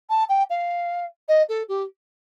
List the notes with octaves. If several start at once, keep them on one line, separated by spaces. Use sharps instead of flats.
A5
G5
F5
D#5
A4
G4